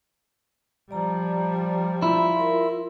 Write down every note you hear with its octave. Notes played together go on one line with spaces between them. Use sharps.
F3 G3 D5 A#5
E4 F4
A#4